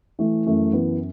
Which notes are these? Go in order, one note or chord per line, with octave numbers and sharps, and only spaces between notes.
E3 A3
F#2 A3
E3 B3